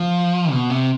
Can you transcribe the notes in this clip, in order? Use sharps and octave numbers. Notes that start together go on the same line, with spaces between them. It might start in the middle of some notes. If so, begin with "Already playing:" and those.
Already playing: F3
B2
C3